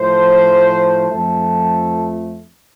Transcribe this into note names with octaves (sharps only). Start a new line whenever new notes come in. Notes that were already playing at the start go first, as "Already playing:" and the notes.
Already playing: A2 F3 A3 C5
F2 F3 A3 A4